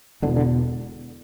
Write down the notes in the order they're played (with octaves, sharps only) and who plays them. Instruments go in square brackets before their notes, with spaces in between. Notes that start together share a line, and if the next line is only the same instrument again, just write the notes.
[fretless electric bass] E1 E2 B2 D3
D3